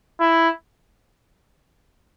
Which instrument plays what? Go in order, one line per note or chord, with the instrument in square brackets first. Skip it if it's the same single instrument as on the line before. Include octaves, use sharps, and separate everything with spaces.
[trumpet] E4